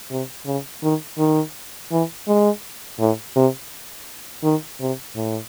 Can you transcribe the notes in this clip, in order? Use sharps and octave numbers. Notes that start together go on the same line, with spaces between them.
C3
C#3
D#3
D#3
E3
G#3
A2
C3
D#3
C3
A2